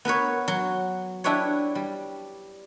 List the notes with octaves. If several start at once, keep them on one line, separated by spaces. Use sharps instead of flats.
B3 A#4 B4 C#5
F#3
D4 E4 G4 B4 C#5
G3